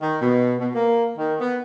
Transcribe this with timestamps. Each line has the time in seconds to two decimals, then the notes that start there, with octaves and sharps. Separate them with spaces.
0.01 D#3
0.21 B2
0.59 B2
0.74 A#3
1.17 D#3
1.40 B3